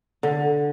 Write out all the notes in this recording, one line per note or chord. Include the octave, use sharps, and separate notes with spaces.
D3